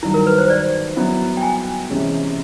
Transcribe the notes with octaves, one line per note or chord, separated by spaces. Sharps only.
G2 D#3 F#3 E4
A#4
B4
C5
D5
F#3 B3 E4
G5
G#5
C3 E3 G#3 C#4